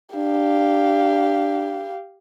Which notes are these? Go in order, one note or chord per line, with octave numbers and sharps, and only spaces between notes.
D4 G4 F5